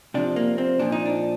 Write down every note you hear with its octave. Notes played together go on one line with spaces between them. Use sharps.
C3 F3 D4
A#3
C4
A#2 F3 D4
D#4
D4